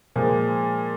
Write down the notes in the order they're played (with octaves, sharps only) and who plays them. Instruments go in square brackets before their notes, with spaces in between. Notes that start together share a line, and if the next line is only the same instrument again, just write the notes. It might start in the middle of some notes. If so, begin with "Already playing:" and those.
[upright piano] A#2 F3 G#3